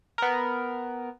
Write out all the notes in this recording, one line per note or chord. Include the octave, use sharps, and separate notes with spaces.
B3 A#4